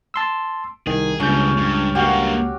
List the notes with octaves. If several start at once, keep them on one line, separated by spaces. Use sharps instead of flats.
A5 C6 E6
C2 D#3 G#4
C#2 G2 C#3 C#4 G6
G2
G2 A#3 F#4 G4